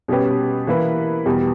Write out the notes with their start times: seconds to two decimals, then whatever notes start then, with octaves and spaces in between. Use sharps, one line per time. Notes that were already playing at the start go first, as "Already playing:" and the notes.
0.08 B2 G3 C#4 G4 B4
0.67 E3 A#3 E4 B4
1.26 E2 B2 G3